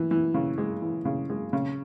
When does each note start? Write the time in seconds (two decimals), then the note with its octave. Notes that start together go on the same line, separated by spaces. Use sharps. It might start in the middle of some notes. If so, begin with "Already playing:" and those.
Already playing: E3
0.11 E3
0.34 C#3
0.58 G#3
0.82 E3
1.05 C#3
1.30 G#3
1.53 C#3